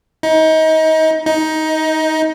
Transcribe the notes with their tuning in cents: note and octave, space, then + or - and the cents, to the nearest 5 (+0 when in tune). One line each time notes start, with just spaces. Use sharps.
D#4 +30
D#4 +15